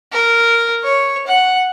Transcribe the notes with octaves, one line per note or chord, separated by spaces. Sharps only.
A#4
C#5
F#5